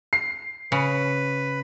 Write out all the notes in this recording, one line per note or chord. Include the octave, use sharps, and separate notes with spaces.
C7
C#3 B4